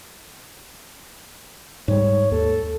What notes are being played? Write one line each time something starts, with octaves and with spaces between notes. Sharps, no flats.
G#2 G3 C#5
D#2 A4